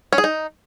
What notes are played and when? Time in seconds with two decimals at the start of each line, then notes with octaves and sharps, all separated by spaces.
0.13 C#4
0.18 G#4
0.24 D#4